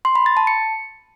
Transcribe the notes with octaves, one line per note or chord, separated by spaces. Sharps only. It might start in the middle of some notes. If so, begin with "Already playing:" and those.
C6
B5
A6
A5
C#7